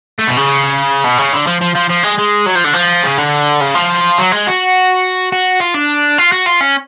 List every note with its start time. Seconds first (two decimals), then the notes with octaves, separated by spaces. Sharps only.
0.19 A3
0.27 B2
0.37 C#3
1.04 B2
1.18 C#3
1.33 D3
1.47 F3
1.61 F3
1.75 F3
1.89 F3
2.03 G#3
2.18 G#3
2.46 F#3
2.55 F3
2.64 D3
2.74 F3
3.03 C#3
3.18 D3
3.61 C#3
3.75 F3
4.18 F#3
4.32 G#3
4.47 F#4
5.32 F#4
5.60 F4
5.74 D4
6.18 F4
6.32 F#4
6.46 F4
6.60 C#4